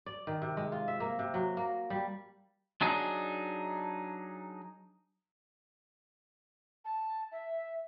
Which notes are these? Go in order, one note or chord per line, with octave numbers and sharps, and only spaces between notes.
D5
D#3
C3
G#3
F4
E5
A#3
C3
F#3
A#3
G3
F#3 D4 D#4 G#4
A5
E5